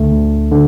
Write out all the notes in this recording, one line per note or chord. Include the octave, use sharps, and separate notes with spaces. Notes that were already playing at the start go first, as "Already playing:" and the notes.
Already playing: D2 D3 A3
D2
D3